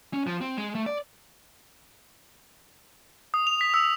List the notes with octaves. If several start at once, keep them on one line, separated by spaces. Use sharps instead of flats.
C#4
F3
C4
G#3
A3
D5
D#6
F7
B6
E6